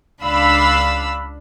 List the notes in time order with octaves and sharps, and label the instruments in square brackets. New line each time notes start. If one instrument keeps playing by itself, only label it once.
[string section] C#2 D4 F5 B5 E6